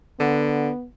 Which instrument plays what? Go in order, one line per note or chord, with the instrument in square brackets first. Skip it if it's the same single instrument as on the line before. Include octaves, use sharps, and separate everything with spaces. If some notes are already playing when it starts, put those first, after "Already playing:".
[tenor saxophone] D3 [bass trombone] B3